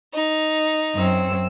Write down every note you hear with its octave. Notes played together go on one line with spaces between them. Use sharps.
D#4
F#2 C4 E6